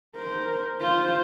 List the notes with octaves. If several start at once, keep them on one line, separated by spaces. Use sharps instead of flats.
A#4 C5
F4 C5